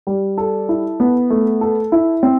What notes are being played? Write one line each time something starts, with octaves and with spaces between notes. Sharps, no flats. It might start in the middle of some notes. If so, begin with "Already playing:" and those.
G3
A4
E4
B3
A3
A4
E4
C4